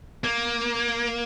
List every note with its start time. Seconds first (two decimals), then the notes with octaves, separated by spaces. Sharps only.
0.24 A#3